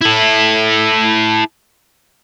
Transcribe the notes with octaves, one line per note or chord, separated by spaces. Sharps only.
E4 A4